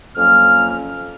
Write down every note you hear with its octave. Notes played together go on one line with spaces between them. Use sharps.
F2 F#3 A#3 C#4 F6